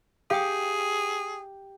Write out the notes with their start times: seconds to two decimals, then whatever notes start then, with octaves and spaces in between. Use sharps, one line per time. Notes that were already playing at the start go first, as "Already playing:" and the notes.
0.31 G4 G#4 F5 G5 D#6